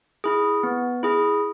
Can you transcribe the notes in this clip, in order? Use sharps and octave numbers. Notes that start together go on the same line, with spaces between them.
E4 G#4
B3
E4 G#4